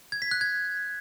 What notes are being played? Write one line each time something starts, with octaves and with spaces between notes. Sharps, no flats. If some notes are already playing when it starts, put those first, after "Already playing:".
G#6
B6
F#6
G#6